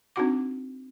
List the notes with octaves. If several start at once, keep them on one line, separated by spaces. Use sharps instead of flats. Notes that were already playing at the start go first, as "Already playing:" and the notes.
C4 D4 D#4 F#4 F#5 D6